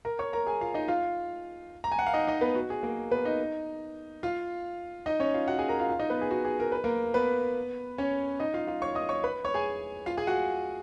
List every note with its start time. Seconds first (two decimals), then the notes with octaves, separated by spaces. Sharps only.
0.05 A#4 A#5
0.19 C#5 C#6
0.33 A#4 A#5
0.46 G#4 G#5
0.61 F4 F5
0.74 D#4 D#5
0.88 F4 F5
1.84 A#5
1.92 G#5
1.99 F#5
2.07 F5
2.13 D#4 D#5
2.27 D#4 D#5
2.41 B3 B4
2.55 F#4
2.70 G#4
2.83 A#3 A#4
3.11 B3 B4
3.25 D#4 D#5
4.23 F4 F5
5.06 D#4 D#5
5.20 C#4 C#5
5.34 F4 F5
5.48 F#4 F#5
5.59 G#4 G#5
5.68 A#4 A#5
5.79 F4 F5
5.90 F4 F5
5.99 D#4 D#5
6.10 B3 B4
6.21 G#4
6.31 F#4
6.45 G#4
6.60 A#4
6.72 B4
6.84 A#3 A#4
7.14 B3 B4
7.98 C#4 C#5
8.40 D#4 D#5
8.54 F4 F5
8.67 F4 F5
8.82 C#5 C#6
8.95 D#5 D#6
9.09 C#5 C#6
9.24 B4 B5
9.45 C#5 C#6
9.54 G#4 G#5
10.06 F4 F5
10.17 G#4 G#5
10.27 F#4 F#5